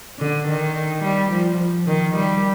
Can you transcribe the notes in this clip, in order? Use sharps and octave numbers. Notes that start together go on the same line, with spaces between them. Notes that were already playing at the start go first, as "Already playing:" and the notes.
D3
D#3
G3
F3
D#3
G3